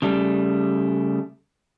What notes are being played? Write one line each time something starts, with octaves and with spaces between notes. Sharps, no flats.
C#3 G3 A3